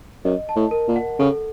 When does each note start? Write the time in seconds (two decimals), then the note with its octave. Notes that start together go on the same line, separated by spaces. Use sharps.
0.25 F#2 D#5
0.49 A5
0.56 A2
0.71 A#4
0.88 A#2
0.96 F#5
1.19 C#3 A4